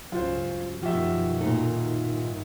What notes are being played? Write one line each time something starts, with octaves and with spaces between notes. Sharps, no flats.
C#2 G2 F#3 C#4 F4 C5
F#2 B2 D#3 F3 F#4 G4 E5
A#2 D#4 A4 A#4
G2 D#3